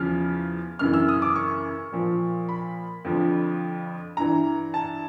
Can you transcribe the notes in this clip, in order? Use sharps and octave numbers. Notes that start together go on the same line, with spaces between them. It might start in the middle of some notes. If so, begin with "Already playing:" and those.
Already playing: E2 C#3 F3 F6
F#2 C#3 E3 F6
E6
D#6
D6
C#6
A#2 F3
B5
F2 D3 F3
G2 E3 A#5
A5